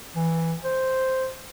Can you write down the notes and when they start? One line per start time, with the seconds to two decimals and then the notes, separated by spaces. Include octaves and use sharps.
0.16 E3
0.64 C5